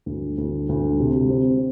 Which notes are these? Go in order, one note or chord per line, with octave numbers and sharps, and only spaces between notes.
D2
D2
D2
C3
C4